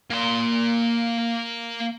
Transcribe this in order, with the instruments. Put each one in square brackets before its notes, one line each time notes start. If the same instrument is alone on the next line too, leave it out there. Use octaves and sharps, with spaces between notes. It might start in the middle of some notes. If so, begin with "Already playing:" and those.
[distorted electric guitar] A#3 C6